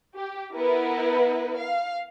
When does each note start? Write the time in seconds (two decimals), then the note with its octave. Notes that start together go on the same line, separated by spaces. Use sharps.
0.15 G4
0.55 B3 E4 A#4 B4
1.59 F5